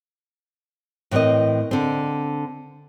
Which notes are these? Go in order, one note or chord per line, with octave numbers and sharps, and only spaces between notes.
A2 E3 C4 A#4 D#5
D3 C4